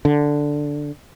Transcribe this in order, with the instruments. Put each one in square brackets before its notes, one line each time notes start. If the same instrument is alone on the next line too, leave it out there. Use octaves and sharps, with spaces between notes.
[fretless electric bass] D3